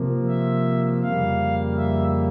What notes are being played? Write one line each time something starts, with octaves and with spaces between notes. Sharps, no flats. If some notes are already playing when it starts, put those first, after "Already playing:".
Already playing: C3 F3 A#3
E5
F2 C#3 G3 A#3 F5
E5